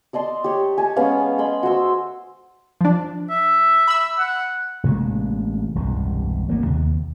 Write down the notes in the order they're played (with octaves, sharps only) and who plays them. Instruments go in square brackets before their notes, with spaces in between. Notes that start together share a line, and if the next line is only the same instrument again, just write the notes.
[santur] D5 D#5 A5 C6
G4 C#5
G#5 A5
G#3 B3 C#4 F5
D#5 B5 C6
F#4 C5 C6 E6
[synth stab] F3 D4
[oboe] E5
[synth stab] B5 E6
[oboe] F#5
[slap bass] A1 C3 G#3 A#3
E1 C2 G2
A1 A#3 B3
D#2 C3